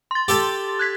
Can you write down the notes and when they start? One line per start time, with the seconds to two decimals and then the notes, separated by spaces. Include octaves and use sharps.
0.11 C6 A6
0.28 G4 A4 A5
0.79 F#6 G#6 B6